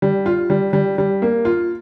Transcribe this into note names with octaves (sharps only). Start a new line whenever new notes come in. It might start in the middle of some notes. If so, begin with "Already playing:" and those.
G3
F4
G3
G3
G3
A#3
F4